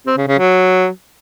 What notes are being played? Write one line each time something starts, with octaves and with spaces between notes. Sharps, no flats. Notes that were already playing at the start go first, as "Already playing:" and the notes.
C4
C#3
C#3
F#3